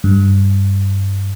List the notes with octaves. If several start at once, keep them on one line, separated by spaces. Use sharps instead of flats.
G2